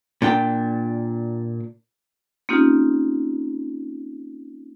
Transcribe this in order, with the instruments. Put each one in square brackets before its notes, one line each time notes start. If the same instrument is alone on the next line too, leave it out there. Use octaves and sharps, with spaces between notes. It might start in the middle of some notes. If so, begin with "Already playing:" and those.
[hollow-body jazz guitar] A#2 D4 G5
[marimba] A#3 C4 C#4 D#4 F4 G4